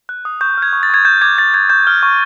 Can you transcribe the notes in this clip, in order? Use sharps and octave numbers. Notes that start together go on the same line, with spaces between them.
F#6
D#6
C#6 G6
F6 G#6
C#6
A6
C#6 G#6
G6
D6 G#6
D6 A6
G6 G#6
C#6 G6
F6
C#6